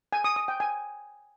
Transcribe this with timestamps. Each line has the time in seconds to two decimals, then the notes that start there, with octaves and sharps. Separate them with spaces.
0.13 G#5
0.24 D#6
0.36 D#6
0.48 G5
0.60 G#5